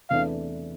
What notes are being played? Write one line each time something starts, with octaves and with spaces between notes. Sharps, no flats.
E2 C3 E3 A3 D4 F5